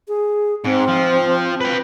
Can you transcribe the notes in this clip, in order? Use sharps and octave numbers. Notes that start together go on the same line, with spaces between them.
G#4
G#2 C4
F3
B4 G5